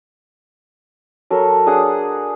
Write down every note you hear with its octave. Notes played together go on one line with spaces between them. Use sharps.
F#3 A4 A#4
D4 G#4 F#5 D#6